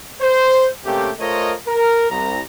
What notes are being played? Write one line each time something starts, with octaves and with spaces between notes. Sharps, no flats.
C5
C3 A3 A#3 C#4 G4
A3 F4 A#4 C5 C#5 D#5
A#4
C2 A#5